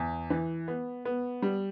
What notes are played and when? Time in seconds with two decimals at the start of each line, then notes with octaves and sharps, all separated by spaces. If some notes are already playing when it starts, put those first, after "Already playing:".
Already playing: E2
0.30 E3
0.68 B3
1.05 B3
1.42 G3